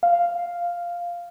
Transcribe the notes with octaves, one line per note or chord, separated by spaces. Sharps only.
F5